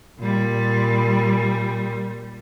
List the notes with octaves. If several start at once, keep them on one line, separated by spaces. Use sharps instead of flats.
A#2 G3